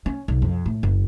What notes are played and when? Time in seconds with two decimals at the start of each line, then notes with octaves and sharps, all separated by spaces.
0.06 C#4
0.28 B1
0.42 F2
0.66 A2
0.83 F#1